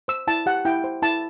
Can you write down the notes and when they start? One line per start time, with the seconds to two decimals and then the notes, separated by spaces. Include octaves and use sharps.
0.08 C5 E6
0.27 E4 A5
0.46 G4 F#5
0.65 E4 G5
0.84 C5
1.02 E4 A5